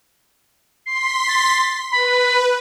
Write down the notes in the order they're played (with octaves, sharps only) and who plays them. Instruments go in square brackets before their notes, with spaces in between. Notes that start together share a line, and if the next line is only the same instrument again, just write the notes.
[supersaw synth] C6 B6 [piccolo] C7
[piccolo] A6
[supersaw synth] B4 [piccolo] B5